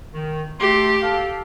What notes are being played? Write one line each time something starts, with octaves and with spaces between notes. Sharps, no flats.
D#3
A3 G4 C6
A4 F5